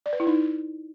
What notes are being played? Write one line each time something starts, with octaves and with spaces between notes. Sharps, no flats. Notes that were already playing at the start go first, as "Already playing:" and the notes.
D5
B4
E4
D#4